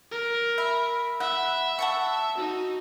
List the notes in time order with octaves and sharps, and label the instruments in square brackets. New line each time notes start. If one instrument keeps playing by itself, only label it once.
[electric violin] A#4
[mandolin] E5 [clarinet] B5
[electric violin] E5 [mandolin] F#5
[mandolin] F#5 A5 C#6
[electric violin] D#4 [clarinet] F#4